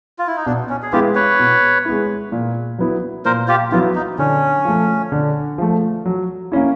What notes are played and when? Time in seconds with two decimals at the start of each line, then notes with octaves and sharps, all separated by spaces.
0.19 F4
0.27 E4
0.36 D#4
0.46 B2 D4
0.69 C#4
0.82 G#4
0.92 G#3 B3 E4 F4 G4
1.15 B4 C#5
1.40 B2
1.85 G#3 B3 E4
2.32 A#2
2.78 F#3 B3 E4
3.25 A#2 A#4 C5
3.48 F4 G4
3.72 F#3 B3 E4 F4
3.95 D#4
4.18 D3 C#4
4.65 F3 A3
5.12 D3
5.58 F3 A3
6.05 F#3
6.52 A#3 C#4 E4